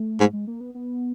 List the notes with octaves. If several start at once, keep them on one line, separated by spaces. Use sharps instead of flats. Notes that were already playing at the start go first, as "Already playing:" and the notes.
Already playing: A3
G#2
G#3
A#3
B3
B3